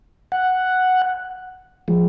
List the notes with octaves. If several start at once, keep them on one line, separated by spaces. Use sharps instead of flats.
F#5
F3 G#3